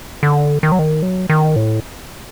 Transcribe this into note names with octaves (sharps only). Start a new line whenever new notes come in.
D3
D#3
F#3
D#3
F#3
D#3
A2